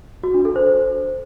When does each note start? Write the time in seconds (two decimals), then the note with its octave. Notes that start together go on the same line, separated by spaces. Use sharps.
0.23 F#4
0.34 D4
0.45 A4
0.56 C5
0.66 C5